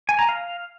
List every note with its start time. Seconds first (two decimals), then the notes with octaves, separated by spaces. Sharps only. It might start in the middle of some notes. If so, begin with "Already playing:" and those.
0.09 G#5
0.19 A#5
0.29 F5